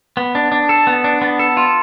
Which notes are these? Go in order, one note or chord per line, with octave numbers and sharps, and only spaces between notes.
B3
D4
D4
A4
B3
D4
B3
A4
F4